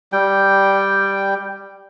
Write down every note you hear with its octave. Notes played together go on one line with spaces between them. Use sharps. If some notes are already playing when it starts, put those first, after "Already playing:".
G3 G5